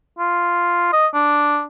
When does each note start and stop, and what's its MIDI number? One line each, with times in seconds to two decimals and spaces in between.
0.19 0.91 65
0.93 1.07 75
1.14 1.63 62